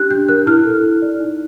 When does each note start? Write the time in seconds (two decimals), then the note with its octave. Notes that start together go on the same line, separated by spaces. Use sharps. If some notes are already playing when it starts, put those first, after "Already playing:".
Already playing: D4 G4 F#6
0.10 D4 G6
0.28 A#4 F#6
0.46 E4 F6
0.65 A4
0.83 E4
1.02 D5
1.20 D#4